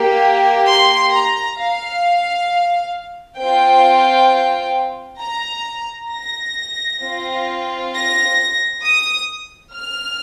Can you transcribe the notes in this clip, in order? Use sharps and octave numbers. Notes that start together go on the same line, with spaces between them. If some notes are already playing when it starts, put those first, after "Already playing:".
Already playing: A#3 G4
C6
A#5
F5
C4 F4 G5
A#5
A#6
C4 F4
A#6
D#6
F6